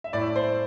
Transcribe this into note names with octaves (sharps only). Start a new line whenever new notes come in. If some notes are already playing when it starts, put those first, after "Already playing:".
E5
A2 A3 E4 D5
C5